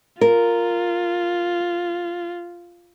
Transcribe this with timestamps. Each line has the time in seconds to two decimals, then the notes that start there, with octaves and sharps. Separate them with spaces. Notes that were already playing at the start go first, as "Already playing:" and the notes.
0.21 F4 A#4